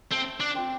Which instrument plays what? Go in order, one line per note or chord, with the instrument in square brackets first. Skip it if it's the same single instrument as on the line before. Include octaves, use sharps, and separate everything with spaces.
[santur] A3 [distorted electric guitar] C4
[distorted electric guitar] D4
[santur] C4 F4